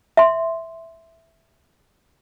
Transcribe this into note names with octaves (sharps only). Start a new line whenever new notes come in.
E5 C6